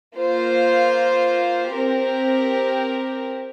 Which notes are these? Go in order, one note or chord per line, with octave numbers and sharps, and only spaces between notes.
A#3 F4 C5
C4 G4 A#4